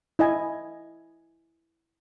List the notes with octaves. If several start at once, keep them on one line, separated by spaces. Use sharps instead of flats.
E4 D#5 G#5